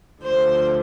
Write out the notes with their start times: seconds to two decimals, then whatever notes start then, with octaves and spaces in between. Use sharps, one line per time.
0.23 D2 D3 F3 C5